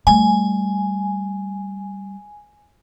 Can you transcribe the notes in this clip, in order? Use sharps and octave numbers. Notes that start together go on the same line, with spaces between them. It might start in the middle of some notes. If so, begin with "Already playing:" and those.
G3 A3 G#5